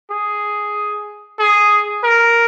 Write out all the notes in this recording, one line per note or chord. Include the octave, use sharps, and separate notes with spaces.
G#4
G#4
A#4